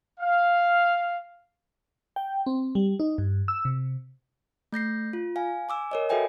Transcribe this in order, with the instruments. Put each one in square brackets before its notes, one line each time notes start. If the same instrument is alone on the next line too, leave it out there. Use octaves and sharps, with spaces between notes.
[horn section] F5
[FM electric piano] G5
C4
G3
D#4
G2
E6
C3
[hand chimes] A3 G6 A#6 C7
F4
F5 G#5
G#5 D6 E6
A#4 C#5 D#5
F#4 A4 B4 E5 G5 G#5